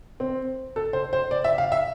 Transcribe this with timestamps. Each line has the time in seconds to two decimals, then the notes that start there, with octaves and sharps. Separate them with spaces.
0.20 C4
0.76 A4
0.93 C5
1.13 C5
1.31 D5
1.44 E5
1.58 F5
1.72 E5